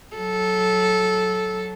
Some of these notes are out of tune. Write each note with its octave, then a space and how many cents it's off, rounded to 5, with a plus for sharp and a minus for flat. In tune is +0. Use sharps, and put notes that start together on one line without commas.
F#3 +0 A4 -15